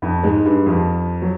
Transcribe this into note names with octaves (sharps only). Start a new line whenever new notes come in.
F2 F3
G#2 G#3
G2 G3
F2 F3
F#3